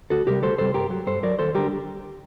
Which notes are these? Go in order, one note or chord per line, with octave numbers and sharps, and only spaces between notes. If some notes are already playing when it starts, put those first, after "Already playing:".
D2 F#4 A4
C3 G3 G4 A#4
D2 A4 C5
C3 G3 A4 C5
G2 G4 A#4
F#3
G2 A4 C5
F#3 A#4 D5
D#2 A4 C5
D3 G3 G4 A#4